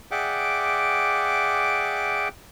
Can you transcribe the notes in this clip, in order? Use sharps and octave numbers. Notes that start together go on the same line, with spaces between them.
G#4 D5 E5 F#5 G5 D6